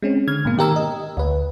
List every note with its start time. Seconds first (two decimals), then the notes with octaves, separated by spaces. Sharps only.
0.02 G#3 C4 C#4
0.28 D3 F6 G#6
0.45 G#2 B2 A#3
0.57 D#3 G4 A#4 E6
0.76 D#5
1.17 D2 B4